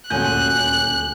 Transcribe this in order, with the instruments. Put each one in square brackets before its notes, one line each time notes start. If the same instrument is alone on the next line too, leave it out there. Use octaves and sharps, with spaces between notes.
[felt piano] D#1 C#4 G6 [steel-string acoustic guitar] D2 G#5 [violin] F#6